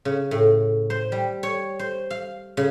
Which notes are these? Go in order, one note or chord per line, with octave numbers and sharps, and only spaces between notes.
C#3
A2
C5
G3
C#5
C5
F5
C#3